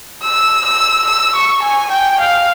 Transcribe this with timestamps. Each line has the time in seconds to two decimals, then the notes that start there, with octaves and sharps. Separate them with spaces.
0.23 E6
0.66 E6
1.07 E6
1.36 C#6
1.63 G#5
1.91 G5
2.20 F5